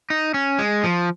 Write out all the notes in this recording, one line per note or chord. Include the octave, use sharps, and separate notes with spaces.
D#4
C#4
G#3
F3